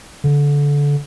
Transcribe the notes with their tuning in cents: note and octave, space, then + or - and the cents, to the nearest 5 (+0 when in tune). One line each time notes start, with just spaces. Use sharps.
D3 -25